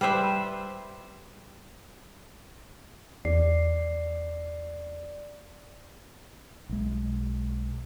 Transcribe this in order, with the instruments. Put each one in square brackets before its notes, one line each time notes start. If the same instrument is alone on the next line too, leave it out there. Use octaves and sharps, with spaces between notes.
[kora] G3 B4 C5 E5
[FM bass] E2 [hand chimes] D5 C7
[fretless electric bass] B1 G#3